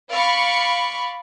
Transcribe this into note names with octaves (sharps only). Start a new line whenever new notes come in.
D5 F5 B5 C#6